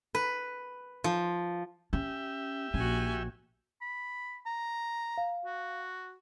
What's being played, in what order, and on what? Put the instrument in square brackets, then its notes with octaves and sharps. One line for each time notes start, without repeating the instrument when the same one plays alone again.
[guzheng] B4
F3
[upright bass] C#4 [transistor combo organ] G4 E5
[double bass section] A#1 [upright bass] C#4 [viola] F#4 G#5
[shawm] B5
A#5
[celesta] F5
[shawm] F#4